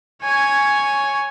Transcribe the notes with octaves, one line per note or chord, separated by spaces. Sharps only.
C#5 G#5